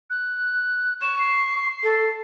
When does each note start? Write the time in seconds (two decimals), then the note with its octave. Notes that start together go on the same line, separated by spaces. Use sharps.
0.10 F#6
1.02 C#6 E7
1.19 C7
1.83 A4